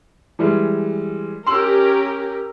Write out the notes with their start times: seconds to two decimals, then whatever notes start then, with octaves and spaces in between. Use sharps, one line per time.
0.39 E3 G3 G#3
1.47 C#4 G4 A#4 C6 E6 F#7